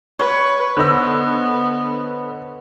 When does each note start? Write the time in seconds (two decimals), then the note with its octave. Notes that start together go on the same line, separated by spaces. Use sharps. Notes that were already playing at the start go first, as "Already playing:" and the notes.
0.19 B4 C#5
0.77 D3 B3 B4 C5 D#5 E6